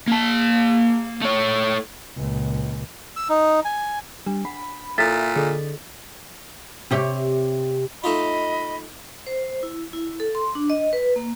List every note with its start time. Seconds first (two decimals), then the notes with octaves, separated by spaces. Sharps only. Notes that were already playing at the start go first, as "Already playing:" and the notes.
0.08 A#3 A5
1.22 A3 C#5
2.16 C#2 A#2
3.16 E6
3.29 D#4
3.65 G#5
4.26 G3 D4
4.45 F#5 B5
4.98 A#2 E4 A4 C#5 E5 A6 B6
5.36 D3 G#4 A4 D#5
6.91 C3 G4 C#5
8.04 A3 D#4 F4 D#5 B5
9.27 C5
9.63 E4
9.93 E4
10.20 A4
10.35 C6
10.55 D4
10.70 D#5
10.93 B4
11.16 A#3